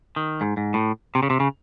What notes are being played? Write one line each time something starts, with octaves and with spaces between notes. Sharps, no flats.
D#3
G#2
G#2
A2
C3
C#3
C3
C#3